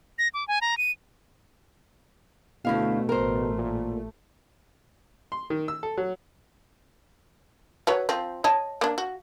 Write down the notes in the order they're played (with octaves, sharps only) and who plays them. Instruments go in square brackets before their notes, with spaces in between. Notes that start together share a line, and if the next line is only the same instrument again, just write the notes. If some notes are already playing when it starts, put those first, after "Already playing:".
[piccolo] A#6
D6
G#5
A#5
D#7
[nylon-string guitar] D2 E4 F5 [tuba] B2 [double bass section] A3
[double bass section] A1 A3 [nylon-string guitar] A#4 C5
[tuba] A#2
[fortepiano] C6
D#3
E6
A4
F#3
[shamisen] F#3 B4 C#5
F3 C4
C#5 D#5 A5
A#3 D4
F#4